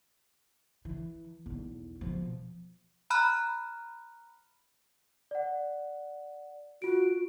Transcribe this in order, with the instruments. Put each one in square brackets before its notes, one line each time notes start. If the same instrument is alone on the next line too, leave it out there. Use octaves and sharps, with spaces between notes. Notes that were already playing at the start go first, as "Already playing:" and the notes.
[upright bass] E3
B1 E2
B2 F3
[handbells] A#5 B5 F6 F#6
[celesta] D5 F#5
[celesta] F4 D7 [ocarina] F#4